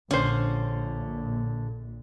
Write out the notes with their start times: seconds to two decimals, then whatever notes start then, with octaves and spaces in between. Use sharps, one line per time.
0.11 A#1 A#2 D3 C#4 C5